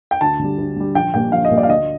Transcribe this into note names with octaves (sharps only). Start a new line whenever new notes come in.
G5
D2 A5
D3 G3
D2
D3 G3
A#1 G5
A#2 G3 A#3 G5
A#1 F5
D#5
A#2 G3 A#3
D5
F5
D2 D#5